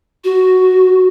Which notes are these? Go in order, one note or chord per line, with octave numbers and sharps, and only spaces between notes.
F#4